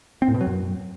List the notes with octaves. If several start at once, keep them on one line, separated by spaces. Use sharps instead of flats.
C4
A2
B2
F#3
F#2